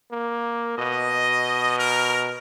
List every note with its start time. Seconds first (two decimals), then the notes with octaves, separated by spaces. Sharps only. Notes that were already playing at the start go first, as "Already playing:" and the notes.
0.11 A#3
0.78 B2 D#5
1.79 A#4